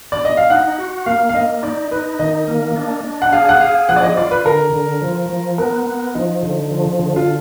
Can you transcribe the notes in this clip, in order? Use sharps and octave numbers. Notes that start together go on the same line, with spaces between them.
D5
D#5
F5
D#4 F#5
F#4
A#3 F5
F5
A#3 D#5
D#4 D5
D#4 B4
D#3 D#5
A#3
D4
D4
F#5
G#4 F5
F#5
G#4 F5
F3 F#5
D5
D#5
F4 D5
B4
D3 A#4
D3
F3
F3
B3 A#4
B3
F3 D#4
D3
F3
D3
F4